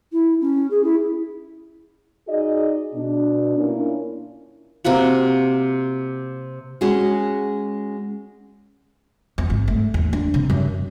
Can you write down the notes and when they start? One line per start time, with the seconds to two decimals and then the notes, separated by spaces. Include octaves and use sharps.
0.13 E4
0.41 C#4
0.71 G#4
0.84 E4
2.28 D#4 F#4 G#4 D5 D#5
2.94 B2 D4
3.57 A#3 C#4 D4 E4 F4 A#4
4.84 C3 A#3 F4 F#4
6.81 G#3 C#4 F#4 G#4
9.38 E2
9.50 G#1
9.68 A3
9.94 D#2
10.13 D4
10.34 C3
10.50 F#2